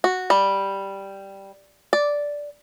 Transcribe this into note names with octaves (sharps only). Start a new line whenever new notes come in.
F#4
G3
D5